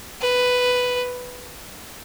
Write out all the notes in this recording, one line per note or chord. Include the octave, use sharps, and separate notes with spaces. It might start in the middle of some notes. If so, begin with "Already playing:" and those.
B4